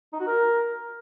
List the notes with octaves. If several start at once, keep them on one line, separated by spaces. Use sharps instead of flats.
D#4
F#4
A#4